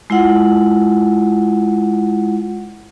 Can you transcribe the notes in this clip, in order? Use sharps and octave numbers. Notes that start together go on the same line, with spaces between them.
G#3 E4 F4 F#5